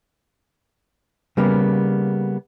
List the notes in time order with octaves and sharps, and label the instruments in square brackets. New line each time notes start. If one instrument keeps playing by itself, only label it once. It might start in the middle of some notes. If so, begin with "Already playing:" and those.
[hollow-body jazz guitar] C#3 G3 A#3 B3